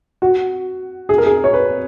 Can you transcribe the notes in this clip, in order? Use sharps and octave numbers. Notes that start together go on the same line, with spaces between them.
F#4
G#4
A#4
G#4
C#5
B4